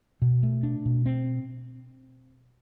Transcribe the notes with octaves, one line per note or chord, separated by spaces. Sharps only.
B2
A3
D4
B2
C4